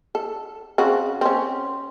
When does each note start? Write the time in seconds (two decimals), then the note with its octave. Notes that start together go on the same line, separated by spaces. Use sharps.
0.15 A4
0.78 C#3 C4 F#4
1.21 C4 C#4